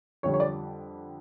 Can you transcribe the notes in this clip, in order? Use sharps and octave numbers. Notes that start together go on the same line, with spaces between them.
F2 D3 G3 C#5
C#5
D5